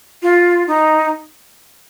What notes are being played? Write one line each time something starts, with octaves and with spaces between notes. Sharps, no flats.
F4
D#4